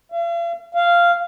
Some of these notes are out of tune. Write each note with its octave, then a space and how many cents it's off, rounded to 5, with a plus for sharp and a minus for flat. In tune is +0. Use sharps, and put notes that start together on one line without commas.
F5 -45
F5 -10